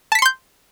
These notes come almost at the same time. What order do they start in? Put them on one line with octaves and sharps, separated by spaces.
A5 B6 C#7 C6 G6